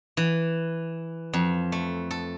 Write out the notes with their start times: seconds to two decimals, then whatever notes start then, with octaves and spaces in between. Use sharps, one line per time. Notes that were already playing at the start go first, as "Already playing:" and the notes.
0.17 E3
1.33 F2
1.72 A3
2.11 A4